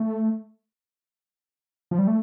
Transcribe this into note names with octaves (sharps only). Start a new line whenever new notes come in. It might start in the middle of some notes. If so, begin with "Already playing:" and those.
Already playing: A3
F3
G3
A3